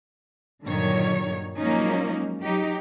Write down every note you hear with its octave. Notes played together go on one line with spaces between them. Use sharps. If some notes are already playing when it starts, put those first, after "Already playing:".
G2 A#2 D3 D#3 F#3 C#5
F3 F#3 G#3 A#3 C#4 D#4
F#3 D#4 G4